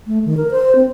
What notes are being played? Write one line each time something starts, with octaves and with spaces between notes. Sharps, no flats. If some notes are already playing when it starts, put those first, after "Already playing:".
A3
D#3
A#4
C5
C4